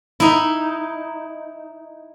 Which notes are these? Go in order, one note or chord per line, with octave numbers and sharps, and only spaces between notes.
D#4 E4